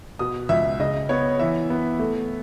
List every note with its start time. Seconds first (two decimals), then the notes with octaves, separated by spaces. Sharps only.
0.19 B2 D#6
0.49 C#2 E5
0.80 C#3 D#5
1.09 B3 C#5
1.39 E3 E5
1.70 B3
1.99 A3